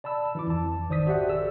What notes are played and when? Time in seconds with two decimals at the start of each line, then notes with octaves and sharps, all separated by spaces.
0.04 D5 A5 B5 E6
0.35 E3 E4 D6
0.47 F2 A5
0.89 G#1 D#3 C5 D5 D#6 B6
1.07 F#4 G4 C5 D5 E5 F#5
1.28 G#4 A#4 D5 E6